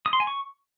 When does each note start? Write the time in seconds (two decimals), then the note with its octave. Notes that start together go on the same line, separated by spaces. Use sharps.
0.06 D#6
0.13 C6
0.20 G#5
0.27 C#6